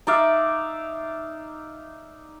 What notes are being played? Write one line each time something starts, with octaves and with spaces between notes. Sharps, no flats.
D#4 D5 E5 F5